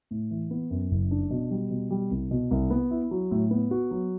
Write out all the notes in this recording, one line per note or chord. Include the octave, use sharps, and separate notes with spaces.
A2
E3
B3
F#2
F#1
D4
B2
G3
B2
G3
C2
B2
C2
B3
E4
F#3
A2
B3
F#4
F#3